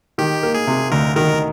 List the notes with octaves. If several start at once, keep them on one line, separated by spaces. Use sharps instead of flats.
D#3 G4
A#3
G#4
C3
D2 A#4
D#3 A#4